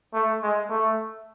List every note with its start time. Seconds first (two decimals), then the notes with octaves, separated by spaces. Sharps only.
0.14 A3
0.43 G#3
0.70 A3